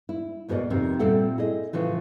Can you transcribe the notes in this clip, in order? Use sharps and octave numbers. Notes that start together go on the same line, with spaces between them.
E4
D#2 G#2 B2 A#4 D5 D#5
F2 C3 D#3 C4
A#2 G3 C4 A4 E5 F#5
E4 G#4 D#5
A2 C#3 E3 F3